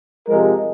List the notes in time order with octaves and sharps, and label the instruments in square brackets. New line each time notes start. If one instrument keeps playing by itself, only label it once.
[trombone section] C3 F3 G#3 A#4